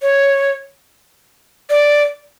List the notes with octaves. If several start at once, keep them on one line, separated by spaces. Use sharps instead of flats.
C#5
D5